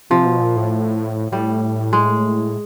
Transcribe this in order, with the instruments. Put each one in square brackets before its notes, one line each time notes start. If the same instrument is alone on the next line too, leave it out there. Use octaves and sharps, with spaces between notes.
[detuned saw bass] C3 [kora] F3
[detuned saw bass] B2
A#2
A2
[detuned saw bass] A2 [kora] G3
[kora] G#3